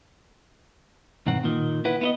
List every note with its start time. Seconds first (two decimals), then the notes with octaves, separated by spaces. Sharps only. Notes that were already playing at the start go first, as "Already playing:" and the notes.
1.27 B1 G2 D#3 C4 F#5
1.44 A#2 D#3
1.85 E4 B4 F#5
2.01 B3 E4 D#5